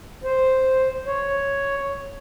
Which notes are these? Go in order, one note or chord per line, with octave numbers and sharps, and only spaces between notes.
C5
C#5